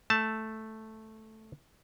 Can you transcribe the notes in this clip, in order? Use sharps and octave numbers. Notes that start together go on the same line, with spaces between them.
A3 A5